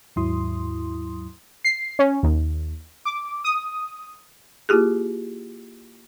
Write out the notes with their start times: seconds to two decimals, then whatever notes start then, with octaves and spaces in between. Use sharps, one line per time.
0.16 D#2 G#2 F#3 E4 C6 D#6
1.65 C7
1.99 C#4
2.23 D#2
3.05 D6
3.44 D#6
4.69 A#3 E4 F4 G4 G#4